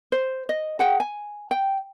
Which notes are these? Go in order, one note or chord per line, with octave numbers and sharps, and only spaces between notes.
C5
D#5
G#4 F#5 G5
G#5
G5